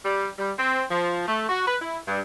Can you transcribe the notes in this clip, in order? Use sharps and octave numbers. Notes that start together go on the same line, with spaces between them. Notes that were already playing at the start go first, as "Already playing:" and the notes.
G3
G3
C4
F3
A3
F#4
B4
E4
G2